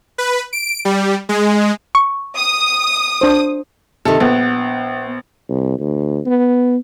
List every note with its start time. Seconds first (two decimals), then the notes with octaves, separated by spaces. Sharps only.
0.18 B4
0.53 D7
0.85 G3
1.29 G#3
1.95 C#6
2.37 D#6
3.21 D4 C5
4.05 C3 D#3 A4
4.20 A#1 B3
5.49 C2
5.79 D2
6.26 B3